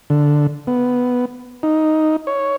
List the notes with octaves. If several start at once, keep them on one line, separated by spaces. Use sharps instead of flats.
D3
B3
D#4
C#5